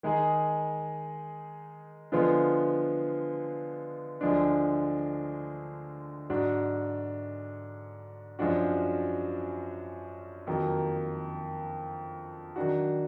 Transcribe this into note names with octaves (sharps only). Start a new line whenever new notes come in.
D#3 G#3 D#4 G#4
D3 F3 G#3 B3 F4
D2 D3 F3 G#3 D4
G#2 F#3 D4 F#4
F#2 F3 G#3 D4 F#4
F2 D#3 F#3 A#3
D#3 F#3 D4 F#4